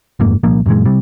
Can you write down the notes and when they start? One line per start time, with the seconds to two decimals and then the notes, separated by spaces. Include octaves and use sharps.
0.20 F#1 F2 G#2 A#3
0.43 C2 A#2 F3 A#3
0.66 F#2 A#2 E3 G#3
0.85 C3 G3